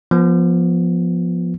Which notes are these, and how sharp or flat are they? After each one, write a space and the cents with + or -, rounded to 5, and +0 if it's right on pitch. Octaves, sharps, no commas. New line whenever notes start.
F3 +0 B3 -20